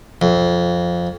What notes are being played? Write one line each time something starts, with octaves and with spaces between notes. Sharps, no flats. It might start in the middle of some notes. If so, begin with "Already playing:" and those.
F2